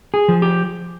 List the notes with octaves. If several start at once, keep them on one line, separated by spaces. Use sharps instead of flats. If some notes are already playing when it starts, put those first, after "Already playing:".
G#4
F3
G4